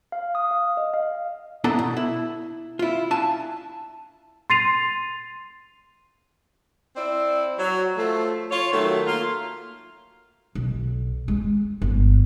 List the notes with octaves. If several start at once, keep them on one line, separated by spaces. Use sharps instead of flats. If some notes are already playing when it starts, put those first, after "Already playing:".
F5
D#6
F5
D#5
F5
B3 D4 E4 A4 F#5 A#5
B2
E4
E4 F4
D4 E4 F5 G#5 A5
C6 A6 C7 D#7 F7
C4 E4 D5
F#3
F3 A3
F4 C#5
D#3 F#3 A3
A#3 F4
B1
G#3
G1